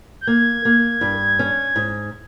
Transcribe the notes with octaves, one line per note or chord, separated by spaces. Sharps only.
G6
A#3 G#6
A#3
G2
C#4
G#2